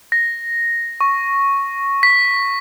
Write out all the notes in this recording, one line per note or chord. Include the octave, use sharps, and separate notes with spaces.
A#6
C#6
B6